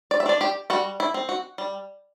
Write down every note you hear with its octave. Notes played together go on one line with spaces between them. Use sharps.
D5
E5
D4 D5
G4
G3 F#4
E4
C4
F#4
G3